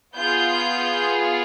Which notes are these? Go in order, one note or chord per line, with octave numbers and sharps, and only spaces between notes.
B3 F4 G#4 G6